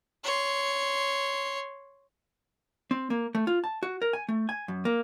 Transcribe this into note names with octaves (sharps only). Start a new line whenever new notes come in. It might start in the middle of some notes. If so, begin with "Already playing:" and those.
C#5 C6
C4
A#3
A3
F4
A5
F#4
A#4
G#5
A3
G#5
F#2
A#3